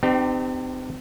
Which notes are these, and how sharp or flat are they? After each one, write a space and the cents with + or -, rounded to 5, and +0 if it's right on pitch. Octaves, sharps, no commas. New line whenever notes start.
C4 -35 D#4 -45 G4 +0